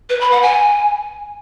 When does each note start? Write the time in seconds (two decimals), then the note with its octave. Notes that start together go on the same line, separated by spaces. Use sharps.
0.10 B4
0.21 B5
0.32 F#5
0.43 G#5